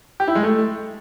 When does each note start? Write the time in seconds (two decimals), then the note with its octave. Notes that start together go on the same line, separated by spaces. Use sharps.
0.20 G4
0.28 E4
0.35 G#3
0.43 A3